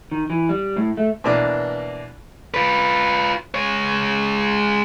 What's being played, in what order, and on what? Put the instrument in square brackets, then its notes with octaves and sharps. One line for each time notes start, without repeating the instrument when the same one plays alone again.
[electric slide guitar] D#3
E3
G3
A2
A3
[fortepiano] B2 E3 A#3 D4 D6
[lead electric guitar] F4 B4
G#3 C#5